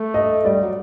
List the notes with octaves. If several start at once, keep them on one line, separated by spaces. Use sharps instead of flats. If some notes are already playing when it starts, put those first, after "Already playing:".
Already playing: A3
D#5
G3 D5
F#3